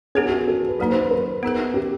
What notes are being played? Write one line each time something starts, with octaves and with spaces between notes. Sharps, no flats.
B3 D4 G4 G#4 A#4 C#5
F#4
A4
B4
F#3 A#3 D#4 B4
C5
B4
A#4
B3 D#4 G#4 B4
G4